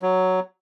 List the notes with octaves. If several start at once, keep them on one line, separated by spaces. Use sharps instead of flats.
F#3